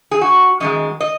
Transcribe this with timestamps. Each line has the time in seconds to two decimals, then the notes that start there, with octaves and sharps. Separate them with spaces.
0.11 G#4
0.21 F#4
0.60 F#2 D#3 G#3 D#5
1.01 D#5